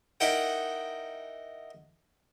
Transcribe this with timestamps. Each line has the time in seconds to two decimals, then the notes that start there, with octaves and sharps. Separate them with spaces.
0.20 D#4 E4 A#4 F#5 G5